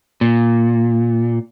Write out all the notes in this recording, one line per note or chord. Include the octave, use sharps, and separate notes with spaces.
A#2